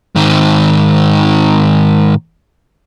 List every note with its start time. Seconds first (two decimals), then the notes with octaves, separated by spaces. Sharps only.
0.15 G#2 D#3